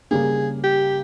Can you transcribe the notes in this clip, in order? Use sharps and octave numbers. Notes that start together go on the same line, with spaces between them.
C#3 G3 A#3 G#4
G4